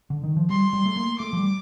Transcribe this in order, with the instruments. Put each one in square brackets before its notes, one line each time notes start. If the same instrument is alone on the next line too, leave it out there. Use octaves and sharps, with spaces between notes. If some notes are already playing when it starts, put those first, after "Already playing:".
[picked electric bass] D3
D#3
F3
[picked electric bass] G3 [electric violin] C6
[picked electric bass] G3
A3
A#3
[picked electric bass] A3 [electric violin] D6
[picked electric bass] F3
G3